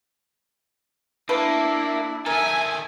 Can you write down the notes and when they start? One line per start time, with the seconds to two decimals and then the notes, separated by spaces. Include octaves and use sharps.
1.29 A3 A#3 D4 E4 B4
2.26 D#3 A4 A#4 E5 G#5